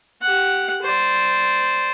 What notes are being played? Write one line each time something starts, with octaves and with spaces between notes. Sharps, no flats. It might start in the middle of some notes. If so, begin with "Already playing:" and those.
G4 F#5
C5 D5